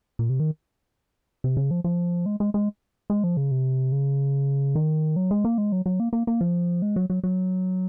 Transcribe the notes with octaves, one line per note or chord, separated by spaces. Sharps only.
A#2
C3
D#3
C3
C#3
F3
F3
G#3
G#3
G#3
G#3
F3
C#3
C3
C#3
D#3
F#3
G#3
A#3
G#3
F#3
F#3
A#3
A#3
A#3
F3
G#3
F#3
F#3
F#3